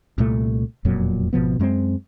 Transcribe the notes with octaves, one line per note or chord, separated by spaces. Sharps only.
C2 A#2 A3
E1 F2 A#2 F#3
G#1 B2 F3 B3
F#2 G#3 A#3 C4